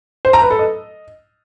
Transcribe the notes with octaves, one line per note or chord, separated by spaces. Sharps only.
C5
A#5
B4
A4
D#5